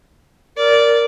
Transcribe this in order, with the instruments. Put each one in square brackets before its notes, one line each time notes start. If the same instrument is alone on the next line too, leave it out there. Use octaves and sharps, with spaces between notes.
[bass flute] A#4 [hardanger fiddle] D5